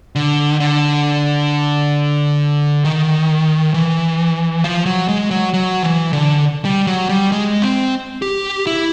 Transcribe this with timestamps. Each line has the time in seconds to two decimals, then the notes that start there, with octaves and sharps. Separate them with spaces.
0.16 D3
0.60 D3
2.84 D#3
3.74 E3
4.64 F3
4.86 F#3
5.08 G#3
5.31 F#3
5.54 F#3
5.83 E3
6.13 D3
6.65 G3
6.87 F#3
7.09 G3
7.32 G#3
7.62 C4
8.22 G4
8.67 E4